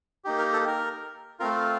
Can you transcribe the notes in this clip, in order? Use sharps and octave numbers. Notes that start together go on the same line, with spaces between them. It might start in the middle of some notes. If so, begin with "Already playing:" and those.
A#3 D#4 G4
A#4
A4
A#4
A3 C4 F4 A#4